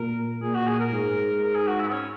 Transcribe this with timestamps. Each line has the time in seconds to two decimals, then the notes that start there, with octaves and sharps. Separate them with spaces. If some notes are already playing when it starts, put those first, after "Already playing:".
Already playing: A#2 A#4
0.42 A#2 G#4
0.55 F#4
0.67 G#4
0.80 A#4
0.92 G#2
1.42 A#4
1.55 G#4
1.67 F#4
1.80 E4
1.88 B3
1.92 C#4